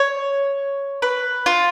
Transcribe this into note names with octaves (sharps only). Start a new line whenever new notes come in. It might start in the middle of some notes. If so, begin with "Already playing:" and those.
Already playing: C#5
B4
F4